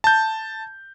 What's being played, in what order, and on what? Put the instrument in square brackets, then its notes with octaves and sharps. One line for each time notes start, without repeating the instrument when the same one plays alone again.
[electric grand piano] A5 G6